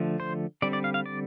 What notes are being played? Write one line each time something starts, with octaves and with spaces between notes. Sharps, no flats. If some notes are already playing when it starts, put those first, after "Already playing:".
Already playing: D3 F3 A3
C5
D3 G3 C4 D5
D5
F5
F5
D5